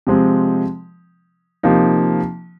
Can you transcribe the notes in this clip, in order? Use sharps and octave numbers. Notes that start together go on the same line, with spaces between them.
C3 F3 G#3 C4
C3 F3 A#3 D#4